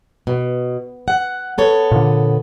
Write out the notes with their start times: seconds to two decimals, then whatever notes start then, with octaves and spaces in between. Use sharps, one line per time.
0.27 B2
1.08 F#5
1.58 B3 A4 C#5
1.92 A#2 D3